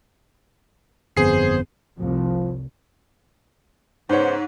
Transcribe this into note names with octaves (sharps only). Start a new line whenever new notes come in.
G1 F2 B3 G#4 C5 C7
F1 C2 F3
G#2 C#3 B3 C5 C#5